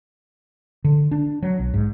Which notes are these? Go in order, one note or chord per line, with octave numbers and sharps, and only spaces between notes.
D3
D4
F#3
B1
G#2